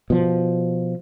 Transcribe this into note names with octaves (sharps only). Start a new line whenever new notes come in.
B2 F3